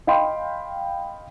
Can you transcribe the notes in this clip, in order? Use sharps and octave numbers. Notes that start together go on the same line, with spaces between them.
D#5 F5 G5 B5 C6